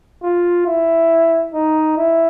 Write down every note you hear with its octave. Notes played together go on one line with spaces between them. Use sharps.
F4
E4
D#4
E4